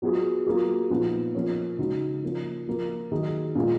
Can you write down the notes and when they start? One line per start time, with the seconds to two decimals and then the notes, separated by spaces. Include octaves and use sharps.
0.02 F#3 B3 F4 G#4
0.47 F#3 A#3 F4 G#4
0.90 A#2 F3 B3 D#4
1.35 F3 A#3 C#4
1.79 C#3 G#3 D#4 F#4
2.23 F3 A#3 C#4
2.67 F3 A#3 F4 A#4
3.12 D#3 F#3 A#3 D#4 G#4
3.55 A#2 G#3 B3 F4 G#4